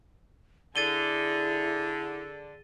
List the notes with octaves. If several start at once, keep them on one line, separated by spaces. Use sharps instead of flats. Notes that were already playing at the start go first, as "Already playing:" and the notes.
D3 E4 G#4 A6 D#7 G7